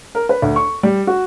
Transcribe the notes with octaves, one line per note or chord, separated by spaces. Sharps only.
A#4
B4
D2
C#6
G3
F#4